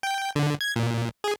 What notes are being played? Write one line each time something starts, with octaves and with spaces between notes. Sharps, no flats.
G5
D3
G#6
A#2
G#4